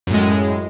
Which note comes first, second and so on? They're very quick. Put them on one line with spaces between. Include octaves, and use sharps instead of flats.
F#2 A2 G#3